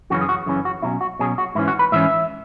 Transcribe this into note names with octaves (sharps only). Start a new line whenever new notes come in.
F#2 C#3 E3 C#4 F#4
G#4
F#4
F#2 C#3 E3 C#4
F#4
B2 F#3 C#4 E4
F#4
B2 F#3 C#4 G#4
F#4
G#2 E3 C#4 E4
F#4
B4
G#2 E3 C#4 E5